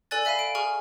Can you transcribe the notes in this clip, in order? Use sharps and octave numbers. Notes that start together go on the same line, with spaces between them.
A4 D5 G#5 F#6 A6
A4 E5 F5 B5 D#7
D7
G#4 G#5 C#6 F6